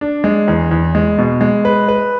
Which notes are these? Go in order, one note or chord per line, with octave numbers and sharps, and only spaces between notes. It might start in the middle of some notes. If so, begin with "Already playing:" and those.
D4
G#3
E2
E2
G#3
B2
G#3
B4
B4